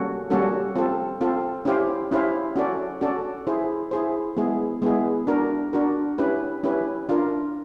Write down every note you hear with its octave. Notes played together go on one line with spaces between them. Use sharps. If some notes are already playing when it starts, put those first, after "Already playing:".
Already playing: G3 A#3 C#4 F#4 A4
G3 A#3 C#4 F#4 A4
C4 F4 A4
C4 F4 A4
C#4 E4 G4 C5 F5
C#4 E4 G4 C5 F5
C#4 F#4 A4 D5
C#4 F#4 A4 D5
E4 G#4 C5
E4 G#4 C5
G#3 B3 E4 G#4
G#3 B3 E4 G#4
D4 F#4 A#4
D4 F#4 A#4
C#4 E4 G4 B4
C#4 E4 G4 B4
D4 F4 A#4